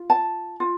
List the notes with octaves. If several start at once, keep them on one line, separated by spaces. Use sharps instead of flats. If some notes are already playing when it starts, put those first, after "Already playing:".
Already playing: F4
A5
F4